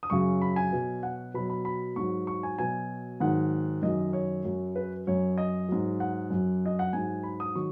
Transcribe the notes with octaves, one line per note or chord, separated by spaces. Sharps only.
D#6
F#2 C#3 F#3 C#6
B5
G#5
B2 F#3
F#5
B2 F#3 B5
B5
B5
G#2 F#3 C#6
C#6
G#5
B2 F#3 G#5
G#2 D#3 F#3 F#5
F#2 D#3 F#3 D#5
C#5
F#2 F#3
B4
F#2 F#3 C#5
D#5
G#2 F#3
F#5
F#2 F#3
D#5
F#5
G#2 F#3 G#5
B5
D#6
D#3 F#3 C#6